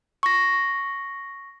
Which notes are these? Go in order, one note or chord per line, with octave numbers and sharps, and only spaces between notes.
C#6 A#6